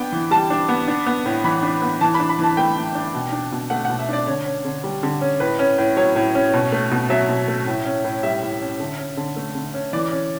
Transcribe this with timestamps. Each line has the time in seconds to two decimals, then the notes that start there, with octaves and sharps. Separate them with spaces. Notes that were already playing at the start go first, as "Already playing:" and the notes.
Already playing: B3 D4 G5
0.12 E3
0.31 G3 A5
0.50 D4
0.69 B3
0.88 D4
1.06 B3
1.26 A2
1.44 E3 B5
1.63 D4
1.82 B3
2.01 E3 A5
2.14 B5
2.20 D4
2.29 B5
2.39 E3 A5
2.57 A3 G5
2.76 E3
2.95 D4
3.15 B2
3.32 D4
3.52 B2
3.70 A3 F#5
3.85 B2 F#5
3.99 E5
4.08 D4 D5
4.27 D3 C#5
4.46 C#4
4.65 D3
4.84 G3
5.03 D3
5.21 C#4
5.40 A2 B4
5.59 C#4
5.78 A2
5.97 F#3 C#5
6.16 A2
6.35 C#4
6.54 B2
6.72 A3
6.91 B2
7.10 F#3 E5
7.29 B2
7.48 A3
7.67 A2
7.85 C#4
8.04 A2
8.23 G3 E5
8.42 A2
8.61 C#4
8.80 D3
8.98 C#4
9.17 D3
9.36 A3
9.55 D3
9.74 C#4
9.93 E3 D5
10.12 C#4